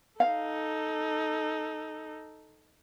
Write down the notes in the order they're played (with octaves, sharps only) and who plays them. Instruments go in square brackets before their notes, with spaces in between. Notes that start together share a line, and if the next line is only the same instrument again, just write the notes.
[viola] D#4 A4 [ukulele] F5